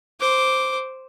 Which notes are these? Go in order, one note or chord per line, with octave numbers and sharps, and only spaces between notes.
C5 D6